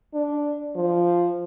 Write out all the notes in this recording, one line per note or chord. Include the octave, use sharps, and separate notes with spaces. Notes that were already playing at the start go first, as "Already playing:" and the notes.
D4
F3